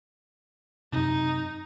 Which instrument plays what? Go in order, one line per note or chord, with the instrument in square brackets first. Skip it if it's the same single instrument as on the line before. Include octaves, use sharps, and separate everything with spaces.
[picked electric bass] F#2 C3 [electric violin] D#4